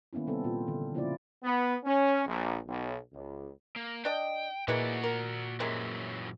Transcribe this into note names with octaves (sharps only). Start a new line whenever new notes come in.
D#3 A#3 B3 C#4 E4
C3 G3 B3 C4 A4
A#2 F4
D3 E3
C#3 F3 A#3 E4 F4 D5
B3
C#4
A#1
B1
C#2
A#3
D4 D#5 G5
A#2 E3 G#3 A#3 F#4 D5 F#5
A#4
F#2 C3 E3 F#3 G#3 A#3